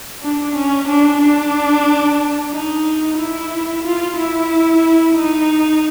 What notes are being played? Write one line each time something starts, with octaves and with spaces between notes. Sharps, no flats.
D4
C#4
D4
D4
D#4
E4
F4
E4
D#4